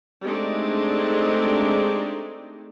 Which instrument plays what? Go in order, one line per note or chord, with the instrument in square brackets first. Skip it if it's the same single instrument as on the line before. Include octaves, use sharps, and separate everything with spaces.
[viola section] G#3 A3 C4 D4 D#4 G4